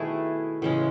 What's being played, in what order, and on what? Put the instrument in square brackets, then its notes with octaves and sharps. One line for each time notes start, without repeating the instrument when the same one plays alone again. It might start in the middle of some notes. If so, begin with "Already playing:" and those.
Already playing: [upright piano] B2 D#3 [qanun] A3 E4 G#4 B4
[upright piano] A2 C#3 [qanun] E3 G#3 C#4